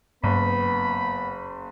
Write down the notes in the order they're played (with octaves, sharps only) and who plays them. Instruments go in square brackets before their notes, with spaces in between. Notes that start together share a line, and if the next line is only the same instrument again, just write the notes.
[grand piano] F#1 [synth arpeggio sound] G2 [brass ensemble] B3 [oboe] B5